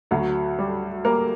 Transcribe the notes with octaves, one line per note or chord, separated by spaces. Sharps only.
D2 F#3 F#4
G3
G3 A#3 A#4